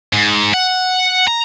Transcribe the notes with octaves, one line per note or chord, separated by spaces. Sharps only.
G#2
F#5
A#5